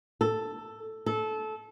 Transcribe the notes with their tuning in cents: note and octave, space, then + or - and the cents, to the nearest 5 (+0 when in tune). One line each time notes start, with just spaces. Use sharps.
A4 +5
A4 -20